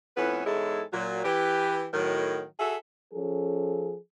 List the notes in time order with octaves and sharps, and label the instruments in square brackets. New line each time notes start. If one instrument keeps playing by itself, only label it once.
[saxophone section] F2 A2 B3 C#4 E4 B4
E2 G#2 G#3 E4 A4 C#5
A#2 F#3
E3 G4 B4
A2 D#3 F#3
F#4 G#4 A4 E5
[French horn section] F3 C#4 G#4 A4